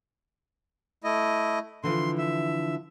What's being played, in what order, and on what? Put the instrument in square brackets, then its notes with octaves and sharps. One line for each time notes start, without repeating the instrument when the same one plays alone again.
[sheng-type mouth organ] A3 E4 D#5
[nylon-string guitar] D3 E3 F3 [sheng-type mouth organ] C6
[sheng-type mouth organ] E5